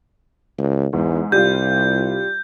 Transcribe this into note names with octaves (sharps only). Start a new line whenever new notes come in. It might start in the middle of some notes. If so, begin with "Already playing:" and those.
C#2
E2 G#2
C2 G3 F4 G6